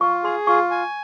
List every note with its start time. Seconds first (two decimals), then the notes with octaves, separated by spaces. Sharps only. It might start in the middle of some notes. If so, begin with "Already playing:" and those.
0.01 F4 C#6
0.24 G#4 C6
0.47 F4 C#6
0.71 G#5